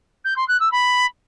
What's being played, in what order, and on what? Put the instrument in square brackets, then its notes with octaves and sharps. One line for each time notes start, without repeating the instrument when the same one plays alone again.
[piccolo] G6
C6
F#6
E6
B5